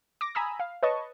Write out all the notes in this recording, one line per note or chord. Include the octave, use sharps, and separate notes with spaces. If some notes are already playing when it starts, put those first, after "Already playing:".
D6 A#6
G#5 A#5 B5 D#6 E6
F5
B4 C#5 D#5 A5 C#6